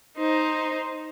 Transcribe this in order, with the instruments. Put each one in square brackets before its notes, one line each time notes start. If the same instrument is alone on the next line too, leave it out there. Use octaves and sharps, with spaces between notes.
[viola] D#4 C5